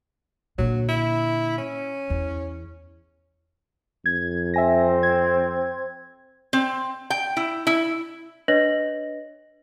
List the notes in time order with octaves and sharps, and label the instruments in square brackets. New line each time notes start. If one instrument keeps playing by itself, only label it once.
[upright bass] A#2 D3 [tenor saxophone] F#3
[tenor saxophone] E4
C#4
[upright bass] E2
[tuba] F2 [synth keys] G#6
[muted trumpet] C4 [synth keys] E5 G#5 A#6
[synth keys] G#6
[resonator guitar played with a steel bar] C4
G5
E4
E4
[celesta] D4 B4 C#5 D#5 A#6 F#7